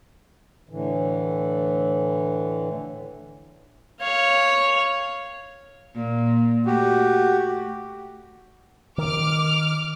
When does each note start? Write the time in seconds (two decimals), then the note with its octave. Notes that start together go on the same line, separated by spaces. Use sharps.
0.69 A2 D3 E3
4.00 C#5 F5
5.94 A#2
6.66 A3 F#4 G4
8.98 D#3 D6 F6